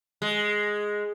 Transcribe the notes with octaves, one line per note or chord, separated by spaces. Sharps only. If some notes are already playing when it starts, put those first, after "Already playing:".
G#3